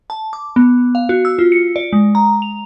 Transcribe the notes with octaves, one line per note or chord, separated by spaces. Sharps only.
A5
D6
B3
F5
F#4
E6
F4
C#7
D5
G#3
A#5
F7